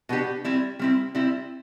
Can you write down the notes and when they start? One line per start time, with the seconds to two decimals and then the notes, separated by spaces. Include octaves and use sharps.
0.09 B2 B3 D4 G4
0.44 G3 C4 E4
0.79 G3 C4 E4
1.15 G3 C4 E4